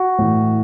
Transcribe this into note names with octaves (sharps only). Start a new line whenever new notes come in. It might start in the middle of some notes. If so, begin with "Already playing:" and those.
Already playing: F#4
A2 E3